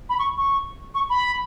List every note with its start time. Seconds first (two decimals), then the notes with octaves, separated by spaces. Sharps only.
0.09 B5
0.19 C#6
0.37 C#6
0.95 C#6
1.10 B5